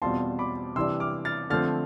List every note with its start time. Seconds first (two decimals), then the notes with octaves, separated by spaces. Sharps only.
0.02 E2 B2 G3 C4 F4 A5 C6
0.39 B5 D6
0.76 C3 E3 G3 D4 C6 E6
1.00 D6 F6
1.25 F6 A6
1.50 D3 F3 A3 C4 F6 A6